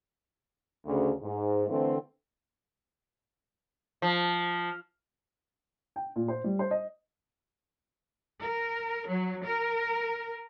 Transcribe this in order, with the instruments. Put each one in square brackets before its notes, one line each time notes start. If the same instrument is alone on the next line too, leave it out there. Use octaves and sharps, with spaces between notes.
[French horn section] D2 C#3
G#2
D3 E3 A3 C4
[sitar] F3
[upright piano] G5
A#2
C5
G3
C5
D#5
[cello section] A#4
F#3
A#4